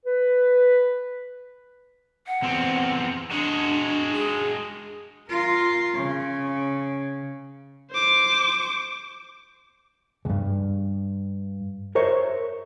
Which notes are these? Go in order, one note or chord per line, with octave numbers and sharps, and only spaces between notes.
B4
F#5
E2 C4
G#3 D4 F#4
G#4
F4 A#4
C#3
C5 D6
C#2 G2
A#4 C5 C#5 E5